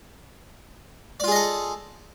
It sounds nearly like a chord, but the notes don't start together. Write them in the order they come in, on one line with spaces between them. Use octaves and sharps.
D5 F4 G#4 D#5 A4